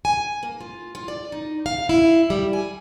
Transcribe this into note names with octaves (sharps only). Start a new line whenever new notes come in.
G#5
A#3
F4
F4
D5
D#4
F5
E4
G3
G#5